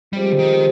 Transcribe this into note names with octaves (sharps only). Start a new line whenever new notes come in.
F3 G3 G#3 C4 G4 C5
D3
D#3